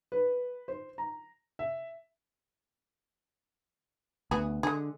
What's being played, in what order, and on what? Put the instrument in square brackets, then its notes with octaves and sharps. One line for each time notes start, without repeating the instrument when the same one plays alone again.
[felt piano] B4
C5
A#5
[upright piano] E5
[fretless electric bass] D2 [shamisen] B3 F#4 G#4
[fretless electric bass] D3 [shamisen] G#3 G#4